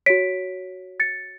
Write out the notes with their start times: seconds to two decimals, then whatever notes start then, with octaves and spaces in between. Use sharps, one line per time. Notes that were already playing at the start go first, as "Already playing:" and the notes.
0.06 F#4 C#5 B6 D7
1.00 A6 C#7